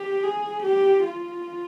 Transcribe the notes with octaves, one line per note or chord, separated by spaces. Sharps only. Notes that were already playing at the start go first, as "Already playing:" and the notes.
Already playing: G4
G#4
G4
F4